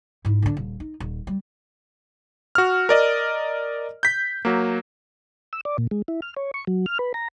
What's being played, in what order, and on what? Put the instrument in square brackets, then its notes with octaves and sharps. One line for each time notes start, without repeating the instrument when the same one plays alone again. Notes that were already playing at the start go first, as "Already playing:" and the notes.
[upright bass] G#2 E4
D3 D4
D#1
D#4
D#1
G3
[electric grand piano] F#4 F6
A#4 D5 D#5
G6 B6
F#3 A#3
[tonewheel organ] E6
D5
A#2
G#3
E4
F6
C#5
C#6
F#3
F6
B4
A#5